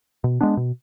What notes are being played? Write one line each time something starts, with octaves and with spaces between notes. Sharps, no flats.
B2
G#3 B3 D4
B2